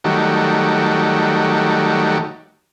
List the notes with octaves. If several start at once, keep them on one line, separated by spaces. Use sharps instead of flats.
D#3 F#3 G3 A3